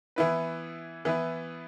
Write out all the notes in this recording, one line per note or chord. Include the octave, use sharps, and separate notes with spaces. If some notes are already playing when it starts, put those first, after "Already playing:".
E3 B3 E4 B4
E3 B3 E4 B4